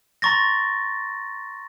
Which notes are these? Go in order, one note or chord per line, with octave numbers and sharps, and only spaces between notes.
A#5 C6 C#6 A6 A#6